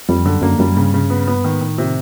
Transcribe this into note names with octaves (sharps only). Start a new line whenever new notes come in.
F2 G3
F#2 D3
F#2 A#3
F#2 G3
G2 C#3
C#3
B3
B3
G#2 D#3
A2 D#3
C3